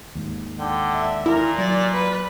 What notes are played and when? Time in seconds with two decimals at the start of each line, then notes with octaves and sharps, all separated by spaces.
0.15 D#2 G#2
0.59 D3 G5
0.93 E5
1.26 A#2 E4 A#4
1.58 F#3 D5
1.92 B4